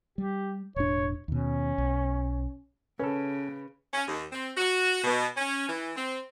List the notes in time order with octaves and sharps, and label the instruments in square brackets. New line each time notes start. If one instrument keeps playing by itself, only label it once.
[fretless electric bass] G3 [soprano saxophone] G4
[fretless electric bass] E1 A2 D4 [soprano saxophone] C#5
[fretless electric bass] D#2 B2 [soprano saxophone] C#4
[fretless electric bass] B1
[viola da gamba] C#3 [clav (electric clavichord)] C#4 A4 [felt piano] B4
[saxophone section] C#4
D#2
C4
F#4
B2
C#4
E3
C4